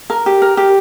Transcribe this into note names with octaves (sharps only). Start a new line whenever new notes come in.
A#4
G4
A#4
G4